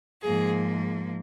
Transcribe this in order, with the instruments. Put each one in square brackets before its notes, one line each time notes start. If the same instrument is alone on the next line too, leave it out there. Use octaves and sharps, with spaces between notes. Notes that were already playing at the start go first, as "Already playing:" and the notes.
[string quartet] G#2 F3 A#3 G#4